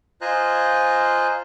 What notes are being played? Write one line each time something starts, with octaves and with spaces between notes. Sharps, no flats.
F4 C5 D#5 G#5 A#5 F#6